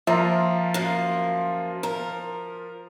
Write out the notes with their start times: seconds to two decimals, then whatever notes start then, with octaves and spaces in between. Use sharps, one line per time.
0.07 F3 A#3 F4 E5 A#5
0.74 F#2 A#3
1.83 A#4